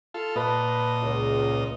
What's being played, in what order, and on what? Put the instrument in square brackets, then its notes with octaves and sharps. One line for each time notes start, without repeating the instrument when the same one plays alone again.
[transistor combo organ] F4 A4
[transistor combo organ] A#2 D#5 [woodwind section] B4 A5 B5
[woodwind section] C#2